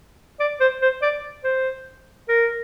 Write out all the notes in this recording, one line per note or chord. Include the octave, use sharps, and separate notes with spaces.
D5
C5
C5
D5
C5
A#4